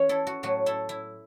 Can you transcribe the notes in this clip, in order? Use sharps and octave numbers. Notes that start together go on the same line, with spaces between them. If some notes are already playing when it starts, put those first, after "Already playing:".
Already playing: E3 C#4 C#5
E4 A4
F#4
A2 F#3 A3 F#4
E4 A4
E4